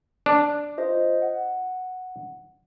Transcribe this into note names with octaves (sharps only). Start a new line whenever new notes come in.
D4
F4 C5 D#5
F#5